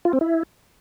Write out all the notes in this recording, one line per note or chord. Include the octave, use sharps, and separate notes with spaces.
F4
C4
E4